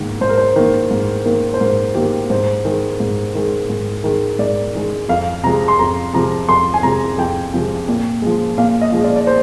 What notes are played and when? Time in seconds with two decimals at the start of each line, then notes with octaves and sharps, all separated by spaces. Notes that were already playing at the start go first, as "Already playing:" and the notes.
Already playing: G#2 D#3 A#3
0.21 G#2 C5
0.29 A#4
0.37 C5
0.56 D#3 A#3
0.91 G#2
1.25 D#3 A#3
1.54 C5
1.60 G#2 A#4
1.95 D#3 A#3 G4
2.30 G#2 C5
2.65 D#3 G#3
3.00 G#2
3.35 D#3 G#3
3.69 G#2
4.04 D#3 G#3
4.39 G#2 D5
4.75 D#3 G#3
5.09 F2 F5
5.43 C3 F3 G#3 A#5
5.68 C6
5.79 F2 A#5
6.13 C3 F3 G#3 A#5
6.48 F2 C6
6.74 G#5
6.83 C3 F3 G#3 A#5
7.18 F2 G5
7.54 C3 F3 G#3
7.88 A#2
8.22 F3 G#3
8.58 A#2 F5
8.81 D#5
8.92 F3 G#3
9.04 D5
9.16 D5
9.27 C5